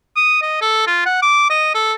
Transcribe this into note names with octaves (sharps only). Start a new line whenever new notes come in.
D#6
D#5
A4
F4
F#5
D6
D#5
A4